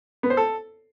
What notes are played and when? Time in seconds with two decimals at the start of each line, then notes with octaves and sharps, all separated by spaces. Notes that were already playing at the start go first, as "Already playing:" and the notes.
0.23 B3
0.30 C5
0.37 A4